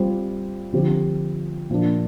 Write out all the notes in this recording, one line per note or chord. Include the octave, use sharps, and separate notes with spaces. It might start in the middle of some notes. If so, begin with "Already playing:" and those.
Already playing: G3 C4 F4
D3 F3 C4 G4
A#2 F3 A#3 D4